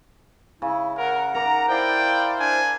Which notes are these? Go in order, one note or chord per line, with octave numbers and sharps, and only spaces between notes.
C#3 E4
A#4 F#5
A#4 A#5 D6
E4 C5 D5 F5 G5
D4 G#5